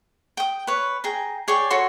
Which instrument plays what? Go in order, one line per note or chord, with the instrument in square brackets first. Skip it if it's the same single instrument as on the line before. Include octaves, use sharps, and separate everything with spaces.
[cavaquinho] G5 D#6
B4 C#5
G#4 G5 A#5
G#4 C#5 D5 G5
F#4 A4 C#5 C6